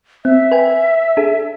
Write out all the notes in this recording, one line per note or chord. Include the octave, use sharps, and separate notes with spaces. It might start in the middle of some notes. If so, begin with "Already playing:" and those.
C4 E5
B4 G5 G#5
D4 G#4 A4